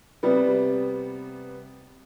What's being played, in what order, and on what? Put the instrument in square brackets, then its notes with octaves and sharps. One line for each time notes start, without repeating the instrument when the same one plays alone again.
[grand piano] C3 G3 B3